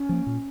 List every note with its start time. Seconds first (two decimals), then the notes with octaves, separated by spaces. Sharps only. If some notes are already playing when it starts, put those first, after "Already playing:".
Already playing: C#4
0.09 F3 A#3
0.27 A#2